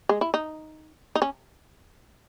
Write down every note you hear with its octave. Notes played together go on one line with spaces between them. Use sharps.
G#3
E4
D#4
D#4
C#4